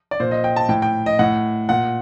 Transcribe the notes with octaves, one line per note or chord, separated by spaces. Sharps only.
D5
A#2 C5
D#5
G5
A5
A2 G5
G5
D#5
A2 F#5
A#2 F#5